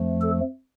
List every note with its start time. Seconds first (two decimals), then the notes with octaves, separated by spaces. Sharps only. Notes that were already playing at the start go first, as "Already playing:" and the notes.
Already playing: F2 F3 A3
0.22 A4